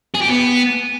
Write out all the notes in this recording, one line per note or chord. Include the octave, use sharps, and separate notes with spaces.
G#4
G4
B3